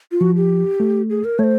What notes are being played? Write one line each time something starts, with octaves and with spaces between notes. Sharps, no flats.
F4
F3 F#4
G4
A3
G#4
A#4
A3 C5 C#5